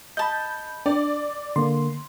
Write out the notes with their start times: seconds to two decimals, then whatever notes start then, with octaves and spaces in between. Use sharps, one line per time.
0.17 D#5 A5 B5 G6
0.86 D4 D5
1.56 D3 A#3 C6